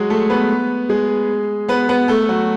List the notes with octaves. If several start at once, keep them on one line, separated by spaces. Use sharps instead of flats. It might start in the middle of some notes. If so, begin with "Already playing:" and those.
Already playing: F#3 G#3 F#4 G#4
A3 A4
B3 B4
G#3 G#4
B3 B4
B3 B4
A3 A4
F#3 F#4